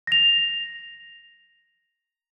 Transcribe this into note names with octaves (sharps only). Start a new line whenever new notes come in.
A#6 F7